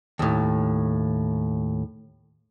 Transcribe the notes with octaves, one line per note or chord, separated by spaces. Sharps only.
D#2 A2